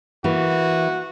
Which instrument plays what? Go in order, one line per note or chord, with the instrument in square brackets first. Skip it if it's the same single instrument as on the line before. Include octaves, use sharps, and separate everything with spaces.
[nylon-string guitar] E3 A#3 [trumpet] F#4